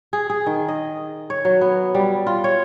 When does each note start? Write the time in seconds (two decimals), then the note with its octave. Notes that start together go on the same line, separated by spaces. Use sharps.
0.13 G#4
0.30 G#4
0.46 D#3
0.68 D#5
1.30 C#5
1.45 F#3
1.61 B3
1.95 G3
2.27 F4
2.44 C#5